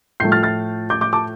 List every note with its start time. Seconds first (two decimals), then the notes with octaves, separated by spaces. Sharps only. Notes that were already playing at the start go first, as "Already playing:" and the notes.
0.20 A2 F3 A3 G6 C7
0.32 F6 A6
0.43 F6 A6
0.90 D6 G6
1.01 D6 G6
1.13 A5 D6